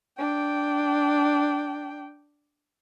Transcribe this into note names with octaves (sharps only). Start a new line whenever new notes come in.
D4 G5